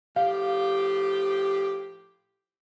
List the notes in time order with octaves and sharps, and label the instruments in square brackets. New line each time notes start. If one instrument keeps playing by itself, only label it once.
[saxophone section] A2 F3 G4 [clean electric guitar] F5